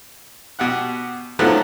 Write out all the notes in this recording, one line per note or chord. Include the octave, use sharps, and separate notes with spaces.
B2 G4 F#5 F#6
A2 D3 D#3 F3 F#3 B3